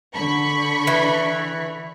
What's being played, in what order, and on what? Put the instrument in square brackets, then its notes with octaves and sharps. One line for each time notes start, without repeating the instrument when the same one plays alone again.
[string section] D3 B5 C#6
[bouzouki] E3